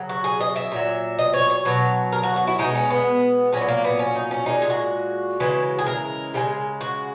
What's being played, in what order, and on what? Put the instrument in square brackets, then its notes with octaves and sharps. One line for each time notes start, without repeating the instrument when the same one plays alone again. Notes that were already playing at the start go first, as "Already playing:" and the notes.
Already playing: [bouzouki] C#3 F#3
F#4
G#4
D#5
E5
A#2 F#3
D#5
C#5
C#5
B2 F#3
A#4
F#4
F#4
E4
B2 G#3 D#4
C#4
B3
A#2 F#3 C#4
B3
A#3
B3
C#4
D#4
C#4
A#2 G#3 D#4
G#4
F#4
C#3 E3 G#3
G#4
A#4
C#3 E3 G#3
F#4